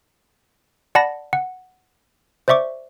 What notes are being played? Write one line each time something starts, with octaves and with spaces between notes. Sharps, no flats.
D5 F#5 A5 B5 A#6
F#5
C5 D5 E5 C#6 D6